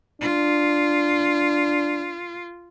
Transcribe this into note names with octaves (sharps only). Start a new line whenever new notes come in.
D4 F4